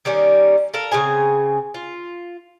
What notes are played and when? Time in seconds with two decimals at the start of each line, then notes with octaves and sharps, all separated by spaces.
0.05 D#3 G3 A#3 C#4
0.74 A4 A#4 F5
0.92 C#3 C4 G#4 G#5
1.74 F4